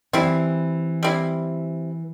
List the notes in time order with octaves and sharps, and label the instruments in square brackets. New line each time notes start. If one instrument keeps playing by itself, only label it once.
[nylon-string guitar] E3 [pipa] G3 C4 E4
[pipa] G3 C4 E4